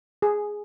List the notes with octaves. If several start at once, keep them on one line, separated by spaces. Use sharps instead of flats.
G#4